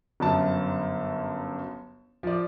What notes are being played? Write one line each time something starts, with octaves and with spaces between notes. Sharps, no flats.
G1 F#2 A5
F3 D5